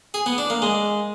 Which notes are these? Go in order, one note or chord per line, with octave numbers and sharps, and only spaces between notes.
G#4
B3
D4
A#3
G#3